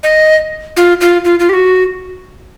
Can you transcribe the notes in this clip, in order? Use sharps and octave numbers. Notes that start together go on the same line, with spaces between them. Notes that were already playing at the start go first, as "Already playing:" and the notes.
D#5
F4
F4
F4
F4
G4
F#4